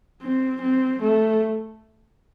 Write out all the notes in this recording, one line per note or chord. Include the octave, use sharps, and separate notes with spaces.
C4
C4
A3